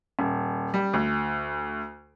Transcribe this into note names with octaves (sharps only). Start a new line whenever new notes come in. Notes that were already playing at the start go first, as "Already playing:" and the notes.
D#1
G3
D2